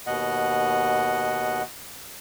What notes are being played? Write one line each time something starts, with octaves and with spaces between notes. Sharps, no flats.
D#2 B2 D#5 F#5